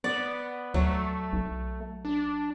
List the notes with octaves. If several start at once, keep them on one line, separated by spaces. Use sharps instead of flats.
B3 D5
D2 F#3 A3
B1
D4